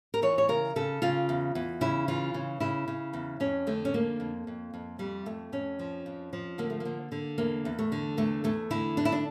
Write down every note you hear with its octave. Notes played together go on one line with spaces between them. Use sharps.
A#4
E3 C#5
C#5
C#3 A#4
C#3 A4
C#3 F4
E2
E2
C#3 E4
E3 F4
C#3
C#3 E4
C#3
E2
F2 C#4
D3 A3
C#4
F2 A#3
F2
F2
F2
F2 G3
F2 A3
F2 C#4
F3
F2
F3
D3 A#3
A3
A#3
D3
D3
E2 A#3
E2
A3
D3
E2 A3
E2 A3
D3 E4
E2 D4
E4
D4